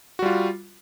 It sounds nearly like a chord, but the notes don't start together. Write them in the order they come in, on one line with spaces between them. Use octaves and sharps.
F#4 G3 F4